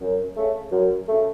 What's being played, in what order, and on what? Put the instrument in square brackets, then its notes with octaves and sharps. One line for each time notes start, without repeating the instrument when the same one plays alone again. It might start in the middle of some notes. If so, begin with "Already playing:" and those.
[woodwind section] F#2
C#3 A3
F#2
C#3 A3